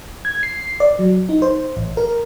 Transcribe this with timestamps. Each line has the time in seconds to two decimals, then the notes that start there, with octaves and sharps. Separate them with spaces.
0.25 G#6
0.43 C7
0.80 D5
0.99 F#3
1.29 D#4
1.42 C5
1.76 A1
1.97 A#4